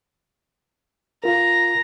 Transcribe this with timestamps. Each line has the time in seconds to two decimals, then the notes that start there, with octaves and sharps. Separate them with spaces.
1.24 F4 A#4 A#5